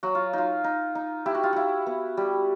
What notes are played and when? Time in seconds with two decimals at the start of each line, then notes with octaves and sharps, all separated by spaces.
0.03 F#3 F#4
0.15 F4
0.33 D#4 F4
0.64 D#4
0.95 D#4
1.26 E4 G4
1.35 F#4
1.43 F4
1.53 E4 F#4
1.86 B3
2.17 G3